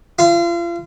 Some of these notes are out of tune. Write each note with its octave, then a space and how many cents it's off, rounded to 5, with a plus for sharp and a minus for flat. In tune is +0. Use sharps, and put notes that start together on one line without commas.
F4 -35